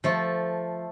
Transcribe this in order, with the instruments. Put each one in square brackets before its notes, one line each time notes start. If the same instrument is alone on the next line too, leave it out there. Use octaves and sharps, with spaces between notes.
[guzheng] F3 A3